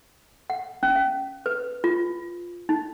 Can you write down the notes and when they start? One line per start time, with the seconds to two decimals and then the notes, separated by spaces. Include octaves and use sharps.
0.50 F#5
0.83 C#4
0.95 F5
1.46 B4
1.84 F4
2.69 D#4